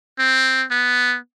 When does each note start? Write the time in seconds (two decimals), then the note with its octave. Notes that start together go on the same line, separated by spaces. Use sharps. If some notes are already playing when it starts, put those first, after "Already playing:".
0.19 C4
0.71 B3